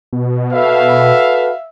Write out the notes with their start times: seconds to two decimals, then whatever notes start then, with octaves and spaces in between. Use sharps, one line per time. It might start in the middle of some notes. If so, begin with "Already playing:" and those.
0.13 B2
0.53 F#4 A4 B4 E5 F5